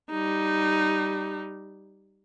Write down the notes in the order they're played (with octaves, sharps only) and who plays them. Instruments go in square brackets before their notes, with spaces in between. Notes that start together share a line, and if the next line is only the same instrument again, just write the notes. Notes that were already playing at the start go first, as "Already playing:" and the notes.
[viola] G3 D#4